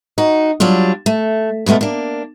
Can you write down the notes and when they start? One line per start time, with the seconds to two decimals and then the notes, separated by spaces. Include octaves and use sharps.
0.18 D#4 F#4
0.60 F#3 G3 D4 F4
1.06 A3
1.66 B2 G#3 A3 B3 F4
1.81 A#3 D4